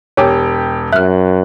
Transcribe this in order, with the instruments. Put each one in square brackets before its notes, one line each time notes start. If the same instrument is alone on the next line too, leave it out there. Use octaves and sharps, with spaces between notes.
[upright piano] E1 G4 [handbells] C#5 G#5 D6
[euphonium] F#2 [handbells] E5 F6 [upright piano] F#6